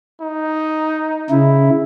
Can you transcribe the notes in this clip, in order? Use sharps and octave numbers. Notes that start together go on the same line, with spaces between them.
D#4
C#3 E4